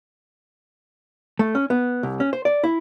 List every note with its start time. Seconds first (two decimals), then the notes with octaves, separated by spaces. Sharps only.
1.39 A3
1.55 C#4
1.70 B3
2.03 C2
2.20 C#4
2.33 C5
2.45 D5
2.64 E4